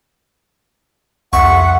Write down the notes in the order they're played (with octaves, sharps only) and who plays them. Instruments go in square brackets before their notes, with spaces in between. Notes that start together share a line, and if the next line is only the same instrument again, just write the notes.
[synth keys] C2 F2 [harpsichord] E5 C#6 [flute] F#5